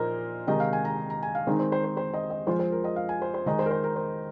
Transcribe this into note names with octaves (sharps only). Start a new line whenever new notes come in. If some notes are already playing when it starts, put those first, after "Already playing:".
Already playing: A#2 F3 A#3 D#4 A#4 C5 D#5
C3 D#3 G#3 D#4 D#5
F5
G#5
A#5
A#5
G#5
F5
D#3 G#3 C4 D#4 C5
C5
C5
C5
C5
D#5
D#5
F3 G#3 F4 C5
C5
A#4
D#5
F5
G#5
C5
C5
D#3 G#3 D#4 D#5
C5
A#4
C5
A#4
C5